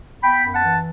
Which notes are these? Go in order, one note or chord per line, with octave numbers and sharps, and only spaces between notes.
B3 G5 B5
F#2
F#5 A5
E3